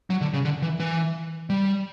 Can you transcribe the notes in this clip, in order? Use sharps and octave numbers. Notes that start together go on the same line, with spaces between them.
F#3
D3
C#3
D3
E3
E3
G3